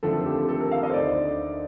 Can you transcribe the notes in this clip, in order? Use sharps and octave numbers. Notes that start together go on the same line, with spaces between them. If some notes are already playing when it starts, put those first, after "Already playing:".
D#2 D3 F3 A3 C4 A4
G4
A4
A#4
F5
D#5
C5
D2 D3 A3 D#4 D5